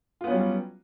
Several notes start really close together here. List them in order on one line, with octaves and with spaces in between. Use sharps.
F4 B3 C#4 F#3 G3